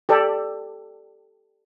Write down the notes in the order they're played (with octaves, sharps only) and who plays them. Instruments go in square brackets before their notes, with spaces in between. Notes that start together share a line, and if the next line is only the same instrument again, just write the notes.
[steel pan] G4 A4 D5